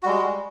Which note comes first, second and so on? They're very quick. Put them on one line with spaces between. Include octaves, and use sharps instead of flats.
F#4 G3 G#3